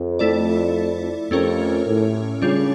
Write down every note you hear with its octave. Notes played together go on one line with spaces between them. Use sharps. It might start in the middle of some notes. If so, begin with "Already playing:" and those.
Already playing: F2
A3 E4 A4 D5
F2 A3 C#4 G4 A#4 C#5
A2
C#3 G3 D4 F4 C#5